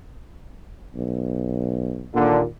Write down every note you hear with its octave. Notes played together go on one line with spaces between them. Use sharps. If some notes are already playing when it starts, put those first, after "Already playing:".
B1
D#2 A#2 D3